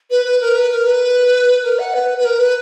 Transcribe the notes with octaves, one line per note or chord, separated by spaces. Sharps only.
B4
B4
A#4
B4
A#4
B4
A#4
F#5
B4
B4
A#4
B4